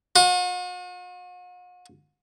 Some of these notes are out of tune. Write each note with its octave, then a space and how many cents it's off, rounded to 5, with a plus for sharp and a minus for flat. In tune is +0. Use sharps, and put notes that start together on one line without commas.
F#4 -45